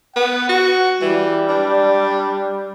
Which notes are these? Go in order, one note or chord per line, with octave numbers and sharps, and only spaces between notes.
B3 F#5
F#4
E3 G3
D4